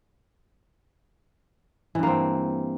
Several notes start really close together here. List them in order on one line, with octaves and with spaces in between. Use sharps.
E3 G2 A#3 C4